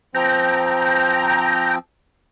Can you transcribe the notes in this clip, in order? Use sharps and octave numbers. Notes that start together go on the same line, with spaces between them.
F3 C4 G5 A#5